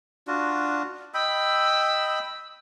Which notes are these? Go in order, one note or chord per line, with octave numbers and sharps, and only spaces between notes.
D4 F4 F#4
D#5 G5 B5 E6